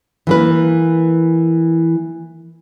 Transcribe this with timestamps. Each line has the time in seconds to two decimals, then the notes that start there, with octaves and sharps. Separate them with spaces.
0.27 E3 A#3 B4